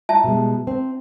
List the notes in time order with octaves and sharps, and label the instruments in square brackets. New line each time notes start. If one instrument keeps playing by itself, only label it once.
[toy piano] E4 E5 A5
[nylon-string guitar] B2 G3 G#3
C4